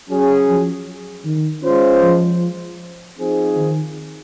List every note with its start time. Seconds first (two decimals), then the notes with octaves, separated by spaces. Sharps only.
0.09 F#3 C#4 G#4
0.47 F3
1.25 D#3
1.63 G#3 C#4 F4 C5
2.02 F3
3.18 F3 C4 D#4 G#4
3.57 D#3